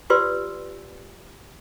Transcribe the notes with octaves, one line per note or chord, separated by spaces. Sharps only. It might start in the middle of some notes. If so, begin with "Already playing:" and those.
F4 G4 B4 D5 C6 E6